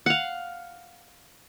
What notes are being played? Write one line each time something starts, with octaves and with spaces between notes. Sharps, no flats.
F5 F#5